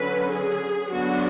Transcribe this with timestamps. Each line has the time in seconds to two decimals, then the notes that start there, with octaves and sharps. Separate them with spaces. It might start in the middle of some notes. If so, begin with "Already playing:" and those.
Already playing: D3 F#3 C#4 B4
0.31 G#4
0.91 D3 F#3 B3 D4 F#4